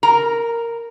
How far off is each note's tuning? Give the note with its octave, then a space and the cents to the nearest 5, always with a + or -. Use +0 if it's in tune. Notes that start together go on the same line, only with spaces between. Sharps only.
A#4 -5 A#5 +0